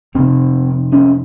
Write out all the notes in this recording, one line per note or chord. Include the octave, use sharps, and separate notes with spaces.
F2 C3 C4
C#4